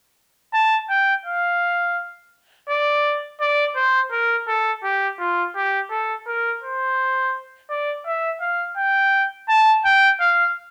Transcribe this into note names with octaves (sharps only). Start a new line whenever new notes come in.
A5
G5
F5
D5
D5
C5
A#4
A4
G4
F4
G4
A4
A#4
C5
D5
E5
F5
G5
A5
G5
F5